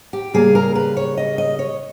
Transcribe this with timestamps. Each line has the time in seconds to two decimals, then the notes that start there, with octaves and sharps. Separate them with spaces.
0.13 G4
0.34 C#3 G3 A#3 G#4
0.55 A#4
0.75 B4
0.97 C#5
1.18 D#5
1.38 D#5
1.59 C#5